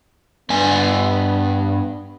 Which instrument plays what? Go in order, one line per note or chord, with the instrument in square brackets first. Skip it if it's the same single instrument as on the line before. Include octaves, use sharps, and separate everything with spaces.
[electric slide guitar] G2 D4 G#5 [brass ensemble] B3